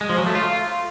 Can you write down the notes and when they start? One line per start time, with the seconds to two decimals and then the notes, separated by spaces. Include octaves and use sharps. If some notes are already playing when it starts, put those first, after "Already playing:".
0.01 G#3
0.09 F3
0.18 F#3
0.26 A3
0.35 F4